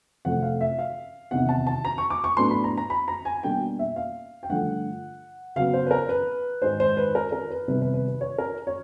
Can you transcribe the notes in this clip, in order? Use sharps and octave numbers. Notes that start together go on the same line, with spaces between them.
F2 C3 F3 A3 C4 F#5
F5
E5
F5
E2 C3 D#3 F#5
A5
A5
A#5
C#6
D6
C#6
A2 F#3 B3 D4 C6
B5
A#5
A#5
B5
A#5
G#5
B2 G3 A#3 D4 G5
E5
F5
G5
G2 D3 F3 A3 F#5
C#3 F#3 B3 F5
C5
B4
A#4
B4
G#2 D#3 G#3 C5
C5
B4
A#4
A#4
B4
C3 D#3 G3 B3 B4
B4
B4
B4
C#5
A#4
C#5